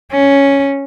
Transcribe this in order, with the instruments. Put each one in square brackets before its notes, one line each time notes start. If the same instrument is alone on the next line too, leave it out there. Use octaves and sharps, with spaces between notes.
[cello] C#4